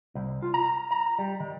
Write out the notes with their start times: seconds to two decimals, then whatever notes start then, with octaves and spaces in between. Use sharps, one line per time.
0.15 C2
0.42 F4
0.54 A#5
0.91 A#5
1.19 G3
1.40 D#3